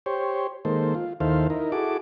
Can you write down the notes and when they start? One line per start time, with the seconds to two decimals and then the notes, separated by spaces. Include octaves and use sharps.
0.06 G4 C5 C#5
0.65 D#3 G#3 A#3 A4 C5
0.95 F4
1.20 D#2 D#3 E4 A4 C5 F5
1.50 D#4 E4 A#4
1.72 E4 F#4 G#4 A4 D6